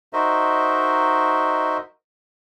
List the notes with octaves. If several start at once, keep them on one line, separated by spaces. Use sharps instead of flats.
D#4 F#4 A#4 C5 D#5 E5